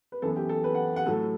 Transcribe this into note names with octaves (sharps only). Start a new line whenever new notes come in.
B4
F#2 E3 B3 A4
G4
A4
B4
F#5
F#5
A2 F#3 A3 A4